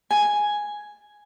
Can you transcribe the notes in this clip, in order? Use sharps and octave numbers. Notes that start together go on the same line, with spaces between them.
G#5